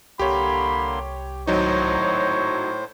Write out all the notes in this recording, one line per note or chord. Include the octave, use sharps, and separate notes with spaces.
C2 D3 A#3 G4 C#5 B5 C6
G#1 A2 F#3 D#4 C5 C#5